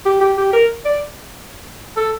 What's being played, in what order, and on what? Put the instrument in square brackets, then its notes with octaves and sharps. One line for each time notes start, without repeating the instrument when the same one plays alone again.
[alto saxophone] G4
G4
G4
A#4
D5
A4